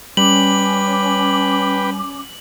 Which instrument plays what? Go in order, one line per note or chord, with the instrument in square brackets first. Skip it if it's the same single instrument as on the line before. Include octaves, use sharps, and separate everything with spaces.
[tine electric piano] G3 [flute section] C#4 D6 [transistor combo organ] B4 G5 [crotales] F#7